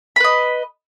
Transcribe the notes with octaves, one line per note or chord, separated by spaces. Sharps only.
B4 D#5 B5